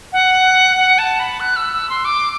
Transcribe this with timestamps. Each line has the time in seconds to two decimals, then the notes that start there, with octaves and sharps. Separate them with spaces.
0.13 F#5
0.77 F#5
0.98 A5
1.20 B5
1.40 F#6
1.56 E6
1.73 E6
1.90 C6
2.05 D6